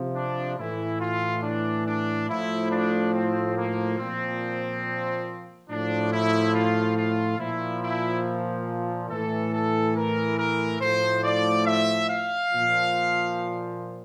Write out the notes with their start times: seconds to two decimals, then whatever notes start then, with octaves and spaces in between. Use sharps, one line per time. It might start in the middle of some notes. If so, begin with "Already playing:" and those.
Already playing: C3 F3
0.15 D4
0.59 A2 E3 E4
1.00 F4
1.43 D4
1.87 D4
2.29 A2 F3 E4
2.71 D4
3.14 C4
3.57 A#3
3.99 A#2 F3 C4
5.69 A2 F3 D4
6.12 E4
6.55 F4
6.98 F4
7.39 A#2 F3 E4
7.83 E4
9.10 A2 E3 A4
9.54 A4
9.96 A#4
10.38 A#4
10.80 A2 F3 C5
11.24 D5
11.66 E5
12.09 F5
12.52 A#2 F3